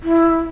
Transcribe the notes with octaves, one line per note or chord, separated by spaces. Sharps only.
E4